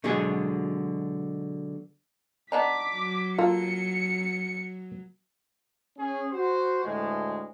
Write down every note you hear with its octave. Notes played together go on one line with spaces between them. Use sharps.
B2 D3 F#3 G#3 G#4
B3 D4 D#4 D6 B6
F#3
A#3 F4 A4 C#7
C#4 G#4
F#4 C5
D2 A2 G#3